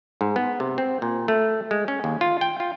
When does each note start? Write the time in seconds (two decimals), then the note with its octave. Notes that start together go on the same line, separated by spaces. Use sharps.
0.21 G#2
0.36 B3
0.60 C3
0.78 C4
1.02 A#2
1.28 A3
1.71 G#3
1.88 C#4
2.04 D#2
2.21 F4
2.41 G5
2.60 F4